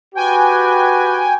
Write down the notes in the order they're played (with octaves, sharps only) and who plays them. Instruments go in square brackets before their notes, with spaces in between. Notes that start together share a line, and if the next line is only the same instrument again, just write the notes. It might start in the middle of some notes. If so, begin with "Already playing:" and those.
[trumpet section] F#4 G4 B4 [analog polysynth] G5 G#5